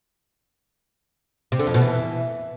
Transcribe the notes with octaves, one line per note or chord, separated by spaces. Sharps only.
C3
D3
F2
B2
E3